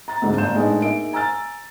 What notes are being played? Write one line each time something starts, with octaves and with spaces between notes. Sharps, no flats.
A#5 A6
D2 G#2 D3
G1 F5 G6 E7
A2 G#3 B3 D4 D#4
A#3 D#4 G#4 E5 D7
G#5 A#5 E6 F6 A6